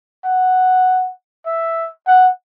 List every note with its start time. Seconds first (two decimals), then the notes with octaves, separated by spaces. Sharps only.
0.24 F#5
1.46 E5
2.07 F#5